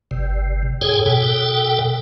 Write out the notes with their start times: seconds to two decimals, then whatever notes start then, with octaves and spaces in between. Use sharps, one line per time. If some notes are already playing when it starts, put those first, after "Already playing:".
0.11 G1 C3
0.81 G#2 G#4 A4 C#5 G5 G#5
1.06 B2 A4 G5